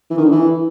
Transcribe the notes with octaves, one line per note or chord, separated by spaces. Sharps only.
E3
D#3
D3
E3